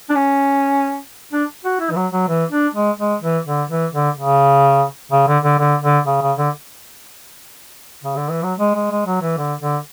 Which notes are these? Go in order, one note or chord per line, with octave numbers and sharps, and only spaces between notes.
D4
C#4
D4
F#4
E4
E3
F#3
F#3
E3
D4
G#3
G#3
E3
D3
E3
D3
C#3
C#3
D3
D3
D3
D3
C#3
C#3
D3
C#3
D3
E3
F#3
G#3
G#3
G#3
F#3
E3
D3
D3